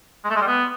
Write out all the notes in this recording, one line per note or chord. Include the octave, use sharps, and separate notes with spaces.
G#3
A3
G#3
G3
B3